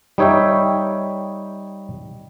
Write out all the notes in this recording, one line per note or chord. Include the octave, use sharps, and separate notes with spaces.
G3 D#4 C#5 E5 G5